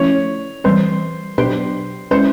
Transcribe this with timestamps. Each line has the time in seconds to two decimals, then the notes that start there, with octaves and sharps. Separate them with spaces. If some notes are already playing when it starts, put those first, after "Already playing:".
Already playing: F3 A3 C#4 E4 C#5
0.64 E3 G3 C4 C5
1.38 B2 F#3 B3 D4 G4 C5
2.11 G#3 C#4 E4 C5